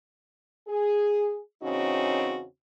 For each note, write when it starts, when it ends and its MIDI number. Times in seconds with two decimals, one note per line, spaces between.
0.68 1.38 68
1.62 2.44 40
1.62 2.44 49
1.62 2.44 60
1.62 2.44 61
1.62 2.44 63
1.62 2.44 66